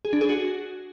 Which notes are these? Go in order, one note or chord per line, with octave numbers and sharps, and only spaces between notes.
G#4
D4
G#4
F#4